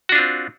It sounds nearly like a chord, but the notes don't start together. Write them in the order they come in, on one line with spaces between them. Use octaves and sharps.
F#4 D4 F4 C4